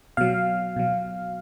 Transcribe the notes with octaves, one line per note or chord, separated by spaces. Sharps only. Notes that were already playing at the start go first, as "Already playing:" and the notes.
B2 F#3 F5
B2 F#3